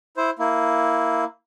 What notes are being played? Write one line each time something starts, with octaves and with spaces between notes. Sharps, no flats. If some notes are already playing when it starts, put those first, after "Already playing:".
E4 C5
A#3 E4